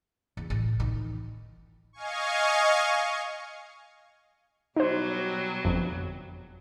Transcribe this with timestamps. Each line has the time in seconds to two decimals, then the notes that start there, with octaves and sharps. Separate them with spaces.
0.37 E2
0.50 A1
0.80 D#3
1.93 D#5 F5 G#5 C#6
4.76 B2 F#3 G3 D#4 C5
5.65 G1 F2